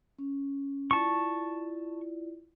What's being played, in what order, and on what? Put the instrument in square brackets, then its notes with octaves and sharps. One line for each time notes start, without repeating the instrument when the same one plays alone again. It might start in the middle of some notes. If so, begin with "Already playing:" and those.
[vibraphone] C#4
[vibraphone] E4 F4 D5 [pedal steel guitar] A5 C#6